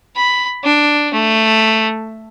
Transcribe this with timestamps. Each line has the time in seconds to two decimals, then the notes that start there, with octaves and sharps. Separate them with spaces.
0.16 B5
0.64 D4
1.14 A3